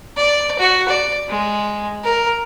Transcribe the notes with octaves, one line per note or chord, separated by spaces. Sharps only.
D5
F#4
D5
G#3
A#4